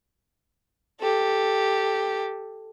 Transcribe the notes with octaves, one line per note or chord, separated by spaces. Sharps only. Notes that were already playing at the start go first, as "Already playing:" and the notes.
G4 A4